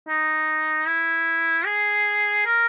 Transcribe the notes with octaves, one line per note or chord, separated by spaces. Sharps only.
D#4
E4
G#4
A#4